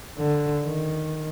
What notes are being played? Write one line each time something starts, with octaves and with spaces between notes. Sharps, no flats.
D3
D#3